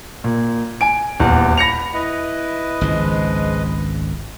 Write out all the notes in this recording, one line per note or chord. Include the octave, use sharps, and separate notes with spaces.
A#2
G#5 D7
D#1 E2
B5 A#6 C#7 F7
E4 B4 D#5
G#1 C#2 G#2 F3 G#3